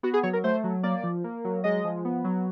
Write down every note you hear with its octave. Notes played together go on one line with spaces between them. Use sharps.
B3 F#4
G#4
F#3 C#5
A#4
A3 C5
F#3
A#3 D5
F3
A#3
F#3
G#3 D#5
F3
B3
F#3